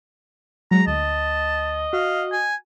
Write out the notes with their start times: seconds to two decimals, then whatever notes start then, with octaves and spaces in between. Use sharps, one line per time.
0.71 F#3 G#3 A#5
0.87 D2 D#5 A5
1.93 F#4 F5
2.32 G#5